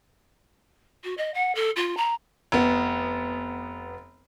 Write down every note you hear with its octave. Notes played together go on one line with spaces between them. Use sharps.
F#4
D#5
F#5
A4
F4
A#5
F1 B3